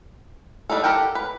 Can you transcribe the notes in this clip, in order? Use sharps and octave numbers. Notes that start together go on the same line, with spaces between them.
G3 D4 D#4 A4
G4 A4 A#4 F#5 G5
B4